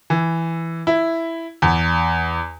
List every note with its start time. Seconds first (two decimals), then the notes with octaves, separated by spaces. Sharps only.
0.10 E3
0.87 E4
1.62 E2